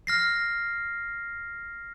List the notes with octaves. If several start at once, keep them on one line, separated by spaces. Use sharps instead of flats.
F6 A#6 C7